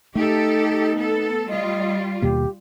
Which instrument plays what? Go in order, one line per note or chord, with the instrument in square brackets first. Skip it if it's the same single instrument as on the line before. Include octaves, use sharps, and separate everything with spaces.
[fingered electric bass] A3 [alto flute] D#4 [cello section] G4 A4
[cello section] B3 A4
[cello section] G3 F4 [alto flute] D#5
[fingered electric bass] D#2 B2 A#3 [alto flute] G4